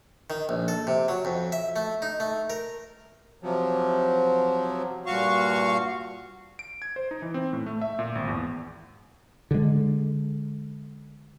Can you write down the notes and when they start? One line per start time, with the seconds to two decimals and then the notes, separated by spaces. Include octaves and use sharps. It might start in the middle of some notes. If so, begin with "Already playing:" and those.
0.30 D#3
0.49 A#1
0.68 A4
0.87 C3
1.08 F#3
1.25 F2
1.52 E5
1.76 A3
2.02 D#4
2.20 A3
2.50 A#4
3.42 C3 F3 F#3
5.06 G2 A#2 F#4 F5 C#6
6.59 D7
6.82 G#6
6.96 C5
7.11 D#4
7.22 E3
7.34 C4
7.53 A2
7.66 A3
7.82 E5
7.99 A#2
8.15 G#1
8.28 E2
9.51 D3 G#3